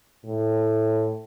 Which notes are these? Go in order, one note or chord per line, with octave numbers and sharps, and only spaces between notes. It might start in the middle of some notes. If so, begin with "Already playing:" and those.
A2